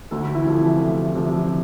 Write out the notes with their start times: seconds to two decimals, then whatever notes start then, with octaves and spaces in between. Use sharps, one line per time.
0.11 D2 A3 A4
0.34 E3 E4
0.46 C3 F3
0.80 D2
1.15 C3 F3